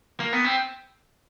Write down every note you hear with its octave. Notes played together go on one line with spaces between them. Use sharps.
A#3
B3
C4